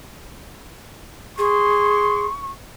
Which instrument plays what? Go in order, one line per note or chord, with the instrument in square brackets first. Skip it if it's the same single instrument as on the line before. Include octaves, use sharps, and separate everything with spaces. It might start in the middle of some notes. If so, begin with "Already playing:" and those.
[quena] G#4 [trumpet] C6 [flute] C#6